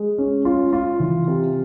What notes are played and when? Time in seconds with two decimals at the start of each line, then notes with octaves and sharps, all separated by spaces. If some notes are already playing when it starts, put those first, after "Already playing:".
Already playing: G#3
0.18 C#4
0.45 F4
0.73 F4
1.00 E3
1.28 C3